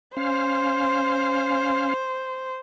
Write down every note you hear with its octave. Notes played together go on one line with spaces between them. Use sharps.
C#4 C5 F5